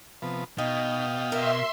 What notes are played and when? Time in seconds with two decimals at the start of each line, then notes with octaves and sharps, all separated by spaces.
0.22 C3 F3 B3
0.58 B2 D#4 D#5 F5 G5
1.32 A#4 E5 C6